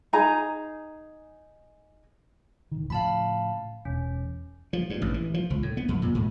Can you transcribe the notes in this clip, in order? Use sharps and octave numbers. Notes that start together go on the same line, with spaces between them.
D#4 G#4 G#5 A#5
D1 D#3
A2 C#3 F3 F5 A5 B5
E1 C#4
F3
G2
A1
E3
F3
C#2
A2
B3
F2
A#2
G#2